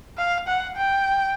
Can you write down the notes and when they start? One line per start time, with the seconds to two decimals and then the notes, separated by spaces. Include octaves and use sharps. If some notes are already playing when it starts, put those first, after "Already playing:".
0.18 F5
0.47 F#5
0.77 G5